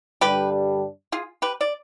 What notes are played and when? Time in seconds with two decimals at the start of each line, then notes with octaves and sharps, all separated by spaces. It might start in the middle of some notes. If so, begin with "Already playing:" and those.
0.21 G2 D3 G3 D4 G4 B4
1.12 F4 G#4
1.42 G4 B4
1.61 D5